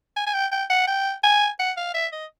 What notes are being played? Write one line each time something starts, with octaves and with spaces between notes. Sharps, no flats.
G#5
G#5
G5
G5
F#5
G5
G#5
F#5
F5
E5
D#5